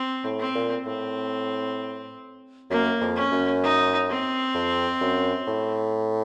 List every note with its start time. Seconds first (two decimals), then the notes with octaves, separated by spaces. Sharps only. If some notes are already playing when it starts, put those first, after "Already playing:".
Already playing: C4
0.24 A2
0.39 C4
0.55 A#2
0.86 A2 C4
2.70 F#2 A#3
3.01 F2
3.16 C#4
3.32 F#2
3.63 D#4
4.09 C4
4.54 F2
5.01 F#2
5.47 A2